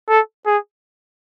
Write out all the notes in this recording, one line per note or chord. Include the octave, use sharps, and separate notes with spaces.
A4
G#4